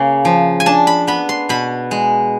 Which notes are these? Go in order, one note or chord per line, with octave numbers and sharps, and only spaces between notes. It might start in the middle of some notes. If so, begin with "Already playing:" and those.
Already playing: C#3 A#3
F3
G#5
D4 A5
B5
B3 B5
C6
B2 B5
G#3